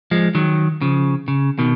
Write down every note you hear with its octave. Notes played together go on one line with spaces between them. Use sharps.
F3 G#3
D#3 F#3
C#3 F3
C#3
B2 D#3